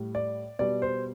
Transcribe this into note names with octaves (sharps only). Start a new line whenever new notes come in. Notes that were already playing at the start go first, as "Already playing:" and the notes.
Already playing: A2 G3
D5
B2 G3 D5
C5